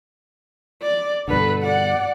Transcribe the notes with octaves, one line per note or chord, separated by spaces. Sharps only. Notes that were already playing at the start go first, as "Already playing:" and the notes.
D5
G2 B2 D3 A4 B4
D5 F#5